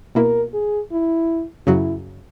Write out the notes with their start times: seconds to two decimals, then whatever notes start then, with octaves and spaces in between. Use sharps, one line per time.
0.15 B2 A#3 E4 A#4
0.54 G#4
0.92 E4
1.67 F#2 C#3 F#3 E4